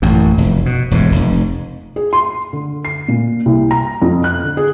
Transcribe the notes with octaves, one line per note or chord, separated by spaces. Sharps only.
A1 F#2 A#2
F1
B2
E1 F2 G#2
F1 F2
G#4
C6
D3
C7
A#2
C2
A#5
F2
F#6
D3
G#4